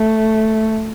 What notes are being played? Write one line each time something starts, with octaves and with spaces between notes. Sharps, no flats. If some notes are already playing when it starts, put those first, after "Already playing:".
Already playing: A3